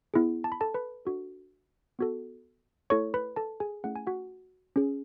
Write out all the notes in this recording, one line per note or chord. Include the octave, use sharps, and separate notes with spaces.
B3 E4 G#4
A5
B5
A4 A5
B4 B5
D4 F#4 A4
B3 F#4 A4
A3 E4 A4 C#5 C#6
B4 B5
A4 A5
G#4 G#5
A3 C#4 E4 G#4 F#5
G#5
F#4 F#5
C#4 G#4